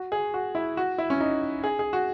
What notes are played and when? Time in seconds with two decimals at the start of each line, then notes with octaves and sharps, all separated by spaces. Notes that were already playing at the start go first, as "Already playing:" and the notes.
Already playing: F#4
0.12 G#4
0.34 F#4
0.55 E4
0.77 F#4
0.98 E4
1.10 C#4
1.21 D#4
1.64 G#4
1.79 G#4
1.93 F#4